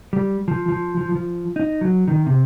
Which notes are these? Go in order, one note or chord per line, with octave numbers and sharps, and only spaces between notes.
G3
F3
F3
F3
F3
D#4
F#3
D#3
C3